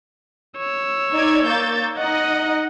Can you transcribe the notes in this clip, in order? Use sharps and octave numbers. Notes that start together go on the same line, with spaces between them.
C#5 E6
D#4 D5 G#6
A#3 G6 A6
D#4 D#5 F#5